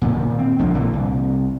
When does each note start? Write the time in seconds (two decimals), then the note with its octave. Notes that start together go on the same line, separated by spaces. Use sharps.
0.02 A#2 D#3
0.39 C4
0.59 A#1 D3 F3 A#3
0.74 A#2 D3 E3
0.93 C2